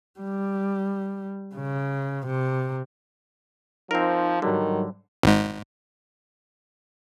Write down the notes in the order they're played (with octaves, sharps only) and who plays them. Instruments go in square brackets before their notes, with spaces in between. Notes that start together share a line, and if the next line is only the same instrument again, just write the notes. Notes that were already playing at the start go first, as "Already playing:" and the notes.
[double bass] G3
C#3
C3
[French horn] F3 [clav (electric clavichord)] C4 A#4 [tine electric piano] D#4
[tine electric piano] G#2 F#3 G3 [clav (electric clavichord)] D3 [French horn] D#3
[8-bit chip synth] G#1 G#2